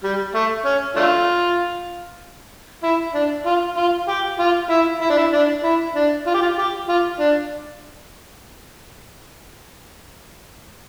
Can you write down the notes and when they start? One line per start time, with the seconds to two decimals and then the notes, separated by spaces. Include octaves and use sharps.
0.04 G3
0.35 A3
0.65 C#4
0.96 A3 D4 F4
2.83 E4
3.14 D4
3.46 F4
3.77 F4
4.09 G4
4.39 F4
4.70 E4
5.02 E4
5.10 D4
5.18 E4
5.33 D4
5.64 E4
5.96 D4
6.27 F4
6.34 G4
6.41 F4
6.58 G4
6.88 F4
7.20 D4